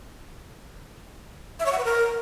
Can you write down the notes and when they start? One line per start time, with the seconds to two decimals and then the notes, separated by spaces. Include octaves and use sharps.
1.60 E5
1.66 C#5
1.72 F#5
1.78 B4
1.85 A#4